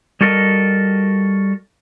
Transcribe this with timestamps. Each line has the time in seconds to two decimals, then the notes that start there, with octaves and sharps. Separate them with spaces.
0.21 G3 F#4 A4 A#4 D#5